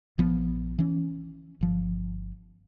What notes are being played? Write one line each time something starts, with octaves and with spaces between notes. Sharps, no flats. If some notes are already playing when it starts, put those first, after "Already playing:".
A#1 F3 B3
E3 C#4
G1 F3